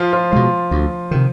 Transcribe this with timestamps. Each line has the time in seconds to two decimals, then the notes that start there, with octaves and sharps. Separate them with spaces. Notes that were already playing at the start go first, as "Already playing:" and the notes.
Already playing: F3 F4
0.13 F3 F4
0.32 B2 F3 G#3 F4
0.71 D2
1.11 C3 D#3